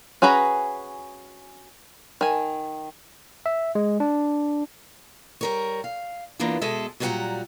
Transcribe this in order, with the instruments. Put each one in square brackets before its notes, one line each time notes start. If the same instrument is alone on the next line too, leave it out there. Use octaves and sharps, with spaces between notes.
[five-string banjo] C#4 F#4 G#4 B4 A#5
D#3 G#5
[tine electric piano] E5
G#3
D4
[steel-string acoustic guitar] G3 A#4 C#5
F5
E3 A#3 B3 D4 F4
B2 G#3 G#4 A4 E5
A#2 F#3 G3 G#4 F#5 A#5